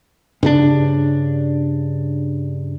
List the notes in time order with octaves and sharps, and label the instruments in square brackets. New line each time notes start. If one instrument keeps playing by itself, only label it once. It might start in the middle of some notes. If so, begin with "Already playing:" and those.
[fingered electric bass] G2 C#3 D4